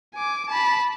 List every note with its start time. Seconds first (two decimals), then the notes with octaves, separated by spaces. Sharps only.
0.14 G#5 D6
0.49 A5 B5